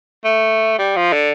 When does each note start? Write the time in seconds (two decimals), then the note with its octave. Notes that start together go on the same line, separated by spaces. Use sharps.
0.24 A3
0.79 G3
0.96 F3
1.13 D3